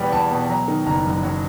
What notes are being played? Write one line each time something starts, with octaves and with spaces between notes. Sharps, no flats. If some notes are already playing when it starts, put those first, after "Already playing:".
Already playing: E2 B2 G3 B3 G5
E2 A5
B2
F#3 A#5
D#3
F#1 A#5
F#2
F#3